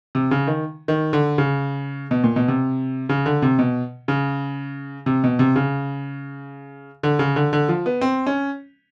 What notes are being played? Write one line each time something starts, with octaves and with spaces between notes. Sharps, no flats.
C3
C#3
D#3
D#3
D3
C#3
B2
A#2
B2
C3
C#3
D3
C3
B2
C#3
C3
B2
C3
C#3
D3
C#3
D3
D3
F3
B3
C4
C#4